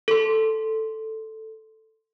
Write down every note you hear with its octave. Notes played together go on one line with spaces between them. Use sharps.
A4 C6